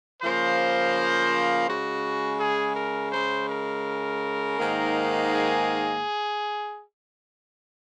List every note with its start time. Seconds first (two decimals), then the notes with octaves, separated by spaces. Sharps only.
0.22 C#3 F3 A#3 C5
1.68 C#3 G#3 F#4
2.40 G#4
2.76 A#4
3.13 C#3 G#3 C5
3.49 A#4
4.59 G#2 D#3 A#3
5.31 G#4